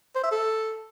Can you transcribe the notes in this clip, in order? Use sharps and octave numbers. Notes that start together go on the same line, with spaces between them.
C5
E5
A4